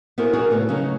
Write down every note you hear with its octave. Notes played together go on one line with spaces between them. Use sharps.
B3 E4 F#4 G#4 A#4 C5
D#4 F#4 G#4 A#4
A2 C#3 A3 B3
C#3 F#3 A3 C#4 D#4